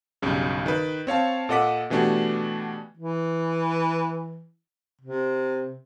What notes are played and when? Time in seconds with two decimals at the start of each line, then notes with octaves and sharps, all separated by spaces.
0.22 B1 G2 C#3
0.66 D#3 B4
1.07 C4 C#5 F5 A5
1.49 A#2 A4 D#5 F#5 D6 B6
1.90 B2 E3 A3 D4 F#4 G4
2.97 E3
5.01 C3